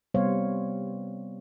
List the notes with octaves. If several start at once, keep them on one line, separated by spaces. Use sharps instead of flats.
C3 G3 B3 C5 C#5 F5